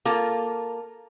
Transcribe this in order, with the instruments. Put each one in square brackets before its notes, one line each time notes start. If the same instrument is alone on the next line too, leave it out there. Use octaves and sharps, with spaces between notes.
[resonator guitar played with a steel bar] A#3 F4 A4